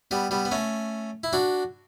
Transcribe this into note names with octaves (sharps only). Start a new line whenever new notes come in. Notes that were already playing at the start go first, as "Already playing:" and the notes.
G3 B3
G3 B3
B3
A3 C#4
E4
D4 F#4